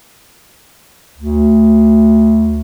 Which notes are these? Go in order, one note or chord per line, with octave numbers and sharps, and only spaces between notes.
D2